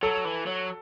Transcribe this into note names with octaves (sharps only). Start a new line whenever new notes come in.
F#3 A4
E3
F#3